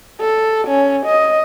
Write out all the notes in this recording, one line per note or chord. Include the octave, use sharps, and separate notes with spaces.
A4
C#4
D#5